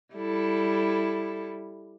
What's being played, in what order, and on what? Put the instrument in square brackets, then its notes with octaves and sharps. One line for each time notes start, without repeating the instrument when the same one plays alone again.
[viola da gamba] G3 E4 A4